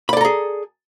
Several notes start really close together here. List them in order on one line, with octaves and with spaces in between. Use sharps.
B5 D5 A4 A#5 G#4